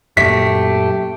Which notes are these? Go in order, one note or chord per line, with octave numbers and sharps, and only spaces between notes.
F#2 A#2 A3 G4 B6